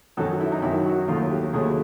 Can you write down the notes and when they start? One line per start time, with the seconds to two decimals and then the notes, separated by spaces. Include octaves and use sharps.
0.17 F#2 D#3 F#3 A4
0.41 E4
0.52 D#4
0.62 F#2 D#3 F#3 E4
0.86 F#4
1.08 D#2 D#3 F#3 A3 F4
1.30 G4
1.53 D#2 D#3 F#3 A3 G#4